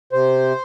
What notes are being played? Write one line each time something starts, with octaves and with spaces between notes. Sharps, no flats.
C3 C5